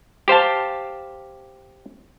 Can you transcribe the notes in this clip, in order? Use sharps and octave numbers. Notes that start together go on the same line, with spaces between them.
G4 C5 F5 A5